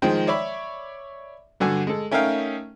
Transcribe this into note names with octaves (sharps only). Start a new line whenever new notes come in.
D#3 F3 G#3 C5 G5
C#5 D5 E5 B5
G2 D3 F#4 G#5
G#3 A4
A3 C#4 D#4 A#4 F5 G5